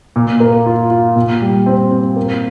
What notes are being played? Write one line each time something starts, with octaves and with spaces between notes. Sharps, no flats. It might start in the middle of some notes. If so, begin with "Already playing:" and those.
A#2
A#3
F4
F4
A#2
G3
C4
C4
A#3